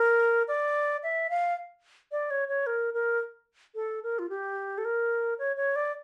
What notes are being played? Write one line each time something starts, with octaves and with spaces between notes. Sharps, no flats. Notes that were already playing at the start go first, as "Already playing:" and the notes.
Already playing: A#4
D5
E5
F5
D5
C#5
C#5
A#4
A#4
A4
A#4
F4
G4
A4
A#4
C#5
C#5
D5